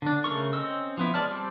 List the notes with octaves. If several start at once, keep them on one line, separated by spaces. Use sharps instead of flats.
D3 D4
C#3 A3 A#4 C#6
C4 C#4 D#5 E6
F3 B3 E4
G#3 D5 A5 F6
G3 C4 G4